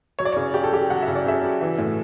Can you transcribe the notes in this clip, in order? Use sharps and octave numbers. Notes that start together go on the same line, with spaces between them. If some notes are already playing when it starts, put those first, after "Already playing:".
F#3 C#5
D5
C#3 C#5
C#3 G4
A4
F#3 G4
F#3 F#5
E5
C#3
D5
C#3 E5
F#3
E3
A2